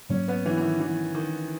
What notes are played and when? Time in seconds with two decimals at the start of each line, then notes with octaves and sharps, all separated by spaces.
0.09 G#2 F#3 A#3 C#4
0.28 B3
0.46 E3
0.57 E3
0.62 D#3
0.80 E3
1.15 D#3